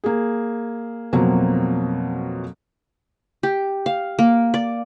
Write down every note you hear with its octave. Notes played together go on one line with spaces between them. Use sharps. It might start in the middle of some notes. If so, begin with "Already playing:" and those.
A#3 G#4
F2 B2 F#3 A#3 C4
G4
F5
A#3
D5